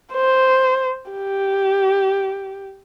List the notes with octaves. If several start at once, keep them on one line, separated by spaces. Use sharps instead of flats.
C5
G4